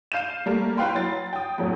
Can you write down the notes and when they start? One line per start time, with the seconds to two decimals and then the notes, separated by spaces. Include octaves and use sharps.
0.12 F5 G6 D#7 E7
0.46 G3 A3 A#3
0.77 E4 B4 F5 G5 B5 C6
0.95 F#3 A6
1.33 G5 D#6
1.58 F2 A2 F#3